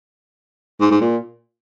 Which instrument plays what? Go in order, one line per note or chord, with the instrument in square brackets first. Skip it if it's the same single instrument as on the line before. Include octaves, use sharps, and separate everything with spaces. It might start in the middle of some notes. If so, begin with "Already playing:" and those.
[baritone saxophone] G#2
G#2
A#2